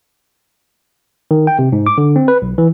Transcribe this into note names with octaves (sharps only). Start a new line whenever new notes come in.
D#3
G5
C3
G#2
D6
D3
C4
B4
B1
E3